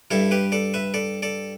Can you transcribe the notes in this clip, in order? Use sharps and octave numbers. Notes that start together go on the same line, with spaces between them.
G2 G3 E4 A4
G4 B4
A4 D5
B4 E5
A4 D5
A4 D5